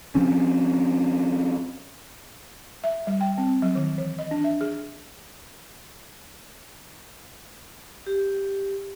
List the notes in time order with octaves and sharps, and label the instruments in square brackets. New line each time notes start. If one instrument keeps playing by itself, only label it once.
[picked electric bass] F3 C4 C#4
[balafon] E5
G3
G5
C4
F#3
D#3
E3
D#5
D4
E5
G#4
[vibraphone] G4